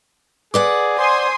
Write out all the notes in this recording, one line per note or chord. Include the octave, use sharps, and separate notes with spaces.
G#4 B4 D5 F#5 D6
C5 G#5 C6 D#6